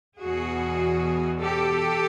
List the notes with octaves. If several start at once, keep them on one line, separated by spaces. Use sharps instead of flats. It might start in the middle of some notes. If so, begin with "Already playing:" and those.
E2 B2 F#4 G#4
G4 A4